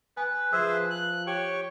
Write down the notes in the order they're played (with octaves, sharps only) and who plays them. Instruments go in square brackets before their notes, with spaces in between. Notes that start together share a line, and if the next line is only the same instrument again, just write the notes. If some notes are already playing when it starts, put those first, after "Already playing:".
[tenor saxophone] B4 [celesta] G#5
[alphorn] F3 [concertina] G#4 C5 E5 [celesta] E6
[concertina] F#6
[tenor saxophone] G4 [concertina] C#5 G5 C#6